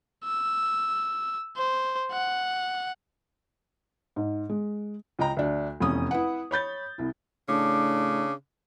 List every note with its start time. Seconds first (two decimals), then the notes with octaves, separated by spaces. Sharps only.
0.25 E6
1.57 C5
2.12 F#5
4.16 G#2
4.49 G#3
5.19 C#2 D#5 G5 A#5
5.37 D2 D4
5.80 F1 E2 C#4 D#6
6.11 E4 B4 F#5
6.51 C#5 B5 G6 A6
6.98 C2 E4
7.49 A2 C#3 D4 D6